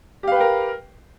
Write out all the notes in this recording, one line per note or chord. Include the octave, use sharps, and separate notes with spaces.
G4 A#4 B4 F5 G5